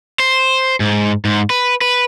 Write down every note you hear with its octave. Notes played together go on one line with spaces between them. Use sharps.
C5
G#2
G#2
B4
B4